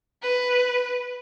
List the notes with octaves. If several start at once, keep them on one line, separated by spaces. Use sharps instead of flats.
B4